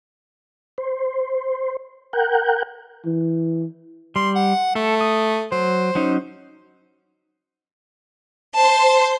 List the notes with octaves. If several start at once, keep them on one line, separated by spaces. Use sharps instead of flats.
C5
A#4 F#5 G5
E3
G3 C6
F#5
A3 A4
D#6
F#3 C5
F#3 C#4 D#4
C5 A5 C6